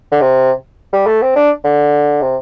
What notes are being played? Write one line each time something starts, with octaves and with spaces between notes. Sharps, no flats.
D3
C3
G3
A3
C4
D4
D3
C3